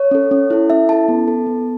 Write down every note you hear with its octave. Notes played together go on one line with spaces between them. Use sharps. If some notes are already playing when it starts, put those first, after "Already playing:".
Already playing: C#5
C#4 A4
C#4
E4 A4
C#4 E5
E4 A4 A5
B3
A4
B3